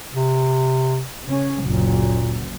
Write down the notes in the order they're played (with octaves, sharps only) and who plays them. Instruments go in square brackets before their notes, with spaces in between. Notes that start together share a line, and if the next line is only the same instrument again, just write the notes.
[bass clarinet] C3
[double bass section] C#3 C#4
[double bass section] F#1 D2 F#3 [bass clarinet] A#2